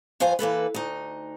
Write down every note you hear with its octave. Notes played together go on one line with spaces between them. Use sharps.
G2 F3 C5 F5 G#5
E3 A#3 A4 B4
D2 D#4